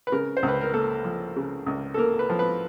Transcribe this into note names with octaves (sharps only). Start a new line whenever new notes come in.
B4
C#3 A#4
C5
C#2
B4
A#4
A#3 A4
F3
C#3
C#2
A4
A#3 A#4
B4
F3
B4